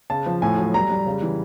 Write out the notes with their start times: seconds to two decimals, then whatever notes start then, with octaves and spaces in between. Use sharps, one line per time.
0.10 C#3 A5
0.26 F3
0.42 A2 G#5
0.58 F#3
0.74 G3 A#5
0.90 G3
1.07 C#3
1.22 E3